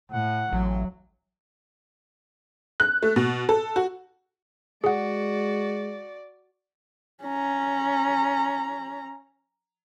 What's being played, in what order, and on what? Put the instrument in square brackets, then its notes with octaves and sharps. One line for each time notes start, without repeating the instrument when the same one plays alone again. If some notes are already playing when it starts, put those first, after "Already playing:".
[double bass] A2 [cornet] F#5
[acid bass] A1 [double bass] F#3
[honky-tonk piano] F#6
A3
B2
A4
F#4
[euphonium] G#3 [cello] F#4 [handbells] G#4 F#5 [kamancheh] D5
[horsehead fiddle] C#4 A#5